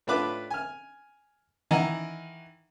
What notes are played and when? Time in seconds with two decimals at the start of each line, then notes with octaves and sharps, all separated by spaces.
0.07 A2 D4 F4 B4 D6
0.50 G#5 F6
1.71 D#3 E3 D#5 F#5 A#5